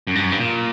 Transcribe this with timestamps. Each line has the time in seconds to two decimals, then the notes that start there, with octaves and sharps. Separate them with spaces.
0.07 F#2
0.15 G2
0.24 F#2
0.32 G2
0.40 A#2